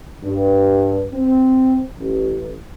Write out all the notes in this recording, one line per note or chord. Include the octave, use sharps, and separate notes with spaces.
G2
C4
A1